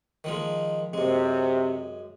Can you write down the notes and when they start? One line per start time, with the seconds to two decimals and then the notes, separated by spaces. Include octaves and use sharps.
0.24 D#3 F3 G#3
0.93 F#2 C3 G#3